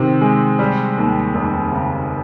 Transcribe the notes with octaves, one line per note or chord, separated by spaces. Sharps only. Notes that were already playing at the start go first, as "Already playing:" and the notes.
Already playing: C3 D#3 C4
G#3
G3
D#2
F1
C#3